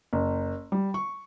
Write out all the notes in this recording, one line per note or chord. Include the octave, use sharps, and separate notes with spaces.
F#1
G3
C#6